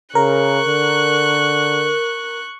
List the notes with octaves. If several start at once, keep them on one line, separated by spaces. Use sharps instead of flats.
C#3 A#4 C#6 F#6
D3